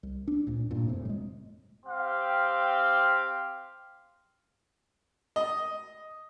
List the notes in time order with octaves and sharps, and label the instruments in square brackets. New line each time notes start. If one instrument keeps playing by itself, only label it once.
[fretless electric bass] C2
D4
D2 A#2
D#1 G2 A#2
F1 A2 C3
G3 G#3
[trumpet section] C4 G4 F5
[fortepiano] D#5